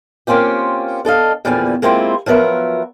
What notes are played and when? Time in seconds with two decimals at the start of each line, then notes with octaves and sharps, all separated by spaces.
0.27 A#3 C4 C#4 F4 G4
1.05 D4 A4 D#5 F5
1.45 E2 A#2 D3 F3 G3 G#5
1.82 G#3 A#3 C4 E4 F4 G4
2.26 F3 F#3 B3 A#4 E5